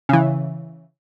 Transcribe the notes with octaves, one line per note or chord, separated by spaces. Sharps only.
C#3 E3